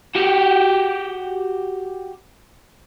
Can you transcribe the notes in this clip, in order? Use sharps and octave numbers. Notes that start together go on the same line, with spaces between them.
F#4 G4